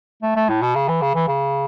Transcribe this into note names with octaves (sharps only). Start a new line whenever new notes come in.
A3
A3
A2
B2
C#3
E3
C#3
E3
C#3